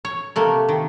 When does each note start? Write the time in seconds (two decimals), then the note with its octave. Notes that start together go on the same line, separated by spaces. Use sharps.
0.05 C#5
0.36 C3 A3 A#3
0.69 D#3